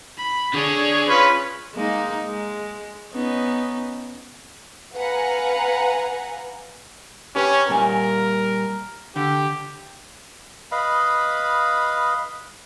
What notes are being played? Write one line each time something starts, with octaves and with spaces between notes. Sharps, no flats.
B5
D3 D4 G#4 C#5
C#4 F4 B4
G#3 A#3 D#4
G#3
B3 C#4 D#4
B4 F5 F#5 G#5 A#5
C#4 G4 B4
A#2 G3 A#4 G#5
D3 G4
B4 D#5 F5 B5